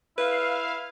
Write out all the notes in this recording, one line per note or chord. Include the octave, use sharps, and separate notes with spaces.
E4 B4 F5